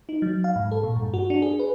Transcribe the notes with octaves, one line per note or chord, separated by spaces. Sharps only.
D#4
F#3
F5
G#2
A4
A#2
G2
F#4
D4
G#4
B4